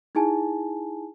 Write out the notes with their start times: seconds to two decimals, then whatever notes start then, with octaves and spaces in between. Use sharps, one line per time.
0.15 D#4 E4 G#4 G#5 A5